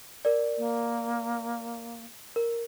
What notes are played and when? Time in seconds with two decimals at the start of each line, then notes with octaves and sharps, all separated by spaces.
0.25 A#4 D5
0.58 A#3
2.36 A#4